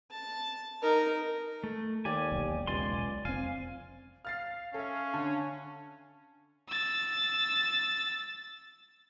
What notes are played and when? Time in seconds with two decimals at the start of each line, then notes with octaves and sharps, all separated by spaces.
0.11 A5
0.82 D#4 A#4
1.64 A3
2.05 D#2 G4 D5 G#5
2.32 E1 B1
2.67 C#2 D5 G#5 C6
3.25 F1 C4 F5 G#5
4.25 F5 F6 A6 C7
4.74 C#4 A4 E5
5.14 D3 A5
6.69 E6 A6